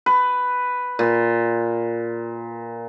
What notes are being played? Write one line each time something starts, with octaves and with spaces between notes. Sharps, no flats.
B4
A#2